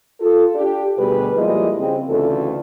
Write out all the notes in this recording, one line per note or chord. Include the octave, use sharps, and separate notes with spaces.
F4 A4
D4 G4
D2 B2 G3 G#4 B4
F3 G3 G#3 A#3 E4 D#5
C#3 C4
D2 C#3 E3 F4 A4